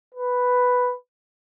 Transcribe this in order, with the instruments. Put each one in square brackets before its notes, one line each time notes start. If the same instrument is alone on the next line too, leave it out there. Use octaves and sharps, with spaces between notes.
[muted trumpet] B4